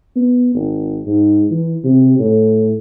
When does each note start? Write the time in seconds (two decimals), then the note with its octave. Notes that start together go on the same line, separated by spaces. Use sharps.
0.16 B3
0.55 G#1
1.07 G#2
1.51 E3
1.84 C3
2.19 A2